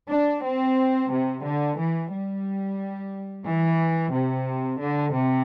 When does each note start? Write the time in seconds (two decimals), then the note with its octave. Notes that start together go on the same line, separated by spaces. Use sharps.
0.10 D4
0.43 C4
1.10 C3
1.44 D3
1.77 E3
2.11 G3
3.45 E3
4.13 C3
4.80 D3
5.13 C3